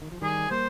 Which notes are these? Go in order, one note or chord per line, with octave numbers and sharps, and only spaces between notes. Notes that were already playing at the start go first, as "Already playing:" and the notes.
D#3
F3
D#3 G3 G#4
G3 A#3 C5